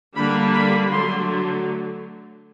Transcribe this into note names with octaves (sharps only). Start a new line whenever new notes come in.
D3 G3 A#3 D4 B5
B5
D3 F#3 A3 C6